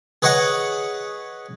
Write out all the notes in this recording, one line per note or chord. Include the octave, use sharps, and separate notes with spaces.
G#4 B4 C#5 D#5 F#5